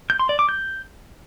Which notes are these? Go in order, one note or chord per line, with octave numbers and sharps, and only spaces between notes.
G6
C6
D5
D6
G6